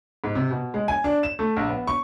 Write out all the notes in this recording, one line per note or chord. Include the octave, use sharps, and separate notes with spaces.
G#2
C3
B2
G#3
G#5
D4
E7
A3
A#1
B3
C#6